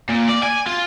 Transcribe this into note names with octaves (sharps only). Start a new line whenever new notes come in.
A#2
D5
G#5
F4